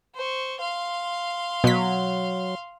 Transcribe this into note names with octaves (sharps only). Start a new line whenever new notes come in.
C5 C#6
F5 C6
B2 F#3 B6